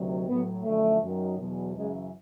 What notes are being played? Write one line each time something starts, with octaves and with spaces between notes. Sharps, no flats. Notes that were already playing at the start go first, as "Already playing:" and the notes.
Already playing: D2 C3 D#3 F#3
A2 F#3 B3
F#2 D3 F3 A3
F#2 D#3 F#3
E2 B2 F#3
F#2 C#3 E3 G#3